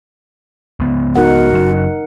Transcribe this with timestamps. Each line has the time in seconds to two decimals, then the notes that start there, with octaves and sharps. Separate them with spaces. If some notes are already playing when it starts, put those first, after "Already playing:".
0.80 C#2 B3
1.16 D#4 F#4 A#4 F#5
1.52 F#1 F#2